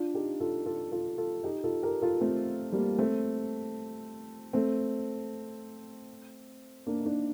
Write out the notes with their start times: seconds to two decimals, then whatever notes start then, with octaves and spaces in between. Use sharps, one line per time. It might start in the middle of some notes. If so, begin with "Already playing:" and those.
Already playing: D4 F4
0.14 D#4 G4
0.40 F4 A4
0.66 F4 A4
0.91 F4 A4
1.18 F4 A4
1.43 D#4 G4
1.64 F4 A4
1.83 G4 A#4
2.01 F4 A4
2.21 A3 C4
2.72 G3 A#3
2.99 A3 C4
4.53 A3 C4
6.86 A#3 D4
7.00 D#4
7.05 A#3 D4